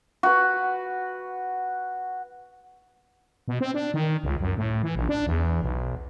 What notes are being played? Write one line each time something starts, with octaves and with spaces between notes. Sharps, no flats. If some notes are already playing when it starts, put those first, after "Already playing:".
F#4 B4
B2
C4
D4
D#3
C#2
F#2
A2
E3
A#1
D4
E2
B1